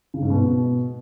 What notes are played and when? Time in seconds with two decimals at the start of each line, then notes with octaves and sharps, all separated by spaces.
0.14 C#3
0.22 G#2
0.30 B2